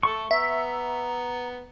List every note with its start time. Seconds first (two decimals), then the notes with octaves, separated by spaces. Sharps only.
0.03 A3 A4 C#6
0.31 B3 E5 A#5